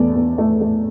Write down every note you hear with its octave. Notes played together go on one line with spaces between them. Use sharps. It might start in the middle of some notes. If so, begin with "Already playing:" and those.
Already playing: E2 A3 D5
E2
A3
A3